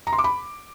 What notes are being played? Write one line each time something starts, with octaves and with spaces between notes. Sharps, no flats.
A#5
C6
D6
B5